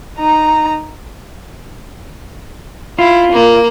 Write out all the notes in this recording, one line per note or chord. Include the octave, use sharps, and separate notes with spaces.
D#4 A#5
E4 F4
A#3